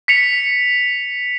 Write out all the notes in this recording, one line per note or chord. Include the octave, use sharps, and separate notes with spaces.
B6 C#7 F7